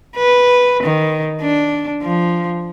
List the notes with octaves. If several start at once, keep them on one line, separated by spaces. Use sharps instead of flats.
B4
D#3
D4
F3